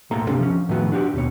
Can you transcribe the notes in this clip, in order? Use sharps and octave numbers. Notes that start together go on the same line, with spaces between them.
B1 A2 A#3 A4 A#5 C6
C3 D#3 C4 D4 A4
F3 C#4
A2 D#3 F3 A3 B3 F#4
D4 F#4 G4 D5
D#2 B2 C#5